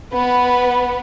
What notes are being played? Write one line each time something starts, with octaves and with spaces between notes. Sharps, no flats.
B3 B4